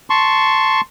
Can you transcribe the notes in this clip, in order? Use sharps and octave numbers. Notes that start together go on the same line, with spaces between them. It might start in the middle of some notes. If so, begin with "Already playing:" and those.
A5 C6 C#6